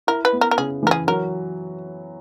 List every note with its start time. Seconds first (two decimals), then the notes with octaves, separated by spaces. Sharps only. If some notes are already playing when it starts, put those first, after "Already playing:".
0.07 E4 A#4
0.25 B4
0.33 B3
0.41 A#4
0.51 A#4
0.58 C#3 G#4
0.83 E3 A#4
0.91 G#4
1.07 F#3 A#4